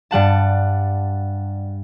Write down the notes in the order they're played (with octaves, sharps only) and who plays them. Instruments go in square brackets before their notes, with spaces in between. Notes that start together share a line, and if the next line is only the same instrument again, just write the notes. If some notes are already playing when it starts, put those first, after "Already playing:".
[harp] G2 G3 F#5 A5